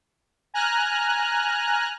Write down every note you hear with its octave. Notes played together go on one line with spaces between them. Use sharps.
G#5 A#5 F6 F#6